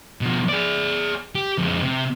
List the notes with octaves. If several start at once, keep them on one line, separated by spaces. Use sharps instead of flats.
B2 F3
G#4 D5
G4
F2 G#3
C3